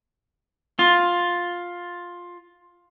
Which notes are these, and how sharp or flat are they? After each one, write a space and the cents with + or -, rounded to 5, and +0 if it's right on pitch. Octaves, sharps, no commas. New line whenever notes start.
F4 +10